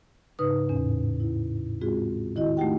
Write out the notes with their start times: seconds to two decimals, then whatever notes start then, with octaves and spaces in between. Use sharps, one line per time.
0.39 G#2 C#3 D#4 B4 D#6
0.69 E2 A2 C#4
1.20 E4
1.81 G#3 C4 F4 F#4 G#4
2.36 D#3 E4 F#4 D#5
2.57 A3 D#4 F4 G4 F#5 G5